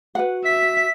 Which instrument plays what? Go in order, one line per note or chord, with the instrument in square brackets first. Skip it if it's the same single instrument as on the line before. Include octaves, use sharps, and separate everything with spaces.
[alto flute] F#4 [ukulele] B4 F#5
[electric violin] E5 [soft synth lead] B6